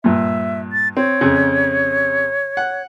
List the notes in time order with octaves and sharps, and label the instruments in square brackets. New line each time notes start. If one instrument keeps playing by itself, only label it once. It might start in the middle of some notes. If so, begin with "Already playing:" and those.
[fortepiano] G2 A#2 [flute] E5
[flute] A6
[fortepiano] C4 [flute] C#5
[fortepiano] F2 C#3
F#5